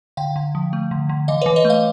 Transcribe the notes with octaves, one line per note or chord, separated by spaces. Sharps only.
D3 F5 G5
D3
F3
A3
D3
D3
E3 D#5 F5
E3 B4 C#5
C#5 D#5
A3
D#5 F5